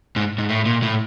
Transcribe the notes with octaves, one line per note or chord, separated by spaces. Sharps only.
G#2
G#2
A2
A#2
A2